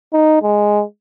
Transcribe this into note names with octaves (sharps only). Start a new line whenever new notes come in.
D#4
G#3